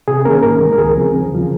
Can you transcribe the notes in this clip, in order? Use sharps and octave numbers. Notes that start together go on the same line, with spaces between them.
C3 G#4
D#3 A#3 C#4 A#4
G#2 A#4
D#3 G#3
A#4
C#2 G#4
C#3 F3 C4
D#2
C#3 F3